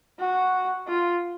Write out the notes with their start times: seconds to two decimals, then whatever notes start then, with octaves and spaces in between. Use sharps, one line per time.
0.19 F#4
0.87 F4